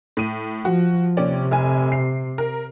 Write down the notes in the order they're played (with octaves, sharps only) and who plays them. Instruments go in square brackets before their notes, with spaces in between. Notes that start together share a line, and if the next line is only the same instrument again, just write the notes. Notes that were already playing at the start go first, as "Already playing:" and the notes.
[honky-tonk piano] A2 D#7
[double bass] F3 [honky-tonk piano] F#4
[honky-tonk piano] D#2 C#4 D5 [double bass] C3
[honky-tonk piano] F1 G#5
C7
A#4